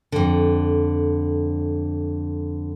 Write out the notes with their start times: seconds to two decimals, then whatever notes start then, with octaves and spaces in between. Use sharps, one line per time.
0.12 F2 D3